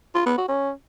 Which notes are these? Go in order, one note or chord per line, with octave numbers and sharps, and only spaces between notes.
F4
B3
F#4
C#4